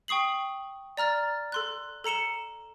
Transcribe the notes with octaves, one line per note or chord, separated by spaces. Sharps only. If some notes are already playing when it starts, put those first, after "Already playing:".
G5 C#6 D#6 C7 F#7
D5 A#5 F6 A6
A4 C6 F#6
A4 A#5 C#7 E7 G7